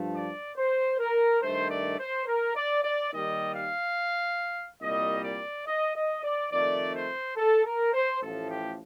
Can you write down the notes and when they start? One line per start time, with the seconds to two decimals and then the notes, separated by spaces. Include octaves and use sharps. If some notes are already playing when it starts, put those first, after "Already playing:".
Already playing: G2 F3 A3
0.14 D5
0.57 C5
0.99 A#4
1.42 G2 D#3 A3 C5
1.70 D5
1.99 C5
2.27 A#4
2.54 D5
2.83 D5
3.12 D#2 D#3 G3 D#5
3.54 F5
4.81 C2 A#2 G3 D#5
5.24 D5
5.66 D#5
5.94 D#5
6.23 D5
6.52 F2 D#3 A3 D5
6.94 C5
7.37 A4
7.65 A#4
7.93 C5
8.21 A1 A2 F3 A4
8.49 G4